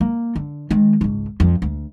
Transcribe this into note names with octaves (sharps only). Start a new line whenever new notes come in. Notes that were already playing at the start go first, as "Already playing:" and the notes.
A#3
D3
D#3 G#3
G#1 C#2
F2
D2